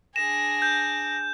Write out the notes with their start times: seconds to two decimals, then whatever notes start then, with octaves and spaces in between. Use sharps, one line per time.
0.16 D4 G#4 A#6 E7
0.62 G6